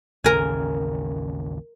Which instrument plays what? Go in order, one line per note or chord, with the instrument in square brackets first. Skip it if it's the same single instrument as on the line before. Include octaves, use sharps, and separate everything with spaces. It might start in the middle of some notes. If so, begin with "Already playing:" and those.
[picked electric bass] A1 D#2 C#3 [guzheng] A#4 G#5